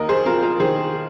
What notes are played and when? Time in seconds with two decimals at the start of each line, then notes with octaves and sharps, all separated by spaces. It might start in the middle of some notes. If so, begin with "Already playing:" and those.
Already playing: D#2 A#4 D#5
0.09 G#4 C5
0.25 C4 F4 A#4
0.43 F4 A#4
0.60 D#3 G#4 C5